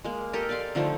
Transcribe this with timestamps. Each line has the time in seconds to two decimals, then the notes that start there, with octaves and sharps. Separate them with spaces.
0.04 G#3 A#3
0.33 G4 A4 A#4 D#5
0.49 D5 F5 C6
0.75 D3 F3 A3 D#4